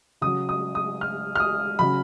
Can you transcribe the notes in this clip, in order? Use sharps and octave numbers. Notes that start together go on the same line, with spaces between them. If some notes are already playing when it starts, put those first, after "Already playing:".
C#3 F#3 D#6
D#6
D#6
F6
F6
D#6
C#3 F#3 B5